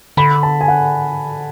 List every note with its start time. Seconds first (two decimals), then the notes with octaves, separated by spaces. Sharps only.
0.17 D3 B5
0.43 A5
0.61 G#5
0.68 F#5